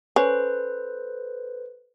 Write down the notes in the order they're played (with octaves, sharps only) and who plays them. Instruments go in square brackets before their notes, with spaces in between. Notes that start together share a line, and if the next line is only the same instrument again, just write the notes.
[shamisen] C#4 [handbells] A4 B4 C5